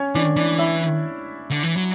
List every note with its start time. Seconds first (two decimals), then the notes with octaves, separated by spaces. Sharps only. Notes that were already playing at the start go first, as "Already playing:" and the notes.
Already playing: C#4 C#5
0.15 E3 D4 D5
0.36 E3 D4 D5
0.58 E4 E5
1.50 D3
1.63 E3
1.77 F#3